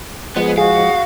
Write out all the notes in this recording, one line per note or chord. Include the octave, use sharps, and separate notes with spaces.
F3 G#3 B3 G#4 B4
F#4 G#4 F5